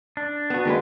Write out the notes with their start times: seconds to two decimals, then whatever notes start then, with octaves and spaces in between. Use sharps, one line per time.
0.17 D4
0.50 B3 F#4 A5 F#6
0.65 D#3 G#3 A#3 D4 F#4 B4